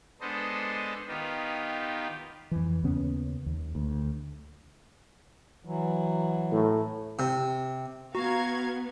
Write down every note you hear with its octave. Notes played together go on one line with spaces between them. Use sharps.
G#3 B3 D4 A4 C5 D#5
D#3 B3 D#4 F4 G4
F2 E3
D#2 C#3 B3 C#4
D#2
D2
E3 F#3
A2
C3
B3 F#4 F5 A#5 G#6